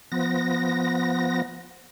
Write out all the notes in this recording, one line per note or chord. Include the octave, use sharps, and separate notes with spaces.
F3 B3 A#6